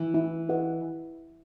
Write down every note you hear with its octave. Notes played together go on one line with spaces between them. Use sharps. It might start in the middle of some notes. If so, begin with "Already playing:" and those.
Already playing: E3
E4
G4 B4 D#5 F#5